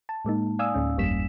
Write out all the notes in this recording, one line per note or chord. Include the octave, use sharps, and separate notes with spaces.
A5
A2 G#3 A#3 D#4
D5 F5 G#5 D#6 E6
D2 A2 C#4
G1 F2 G3 A#3 B6 E7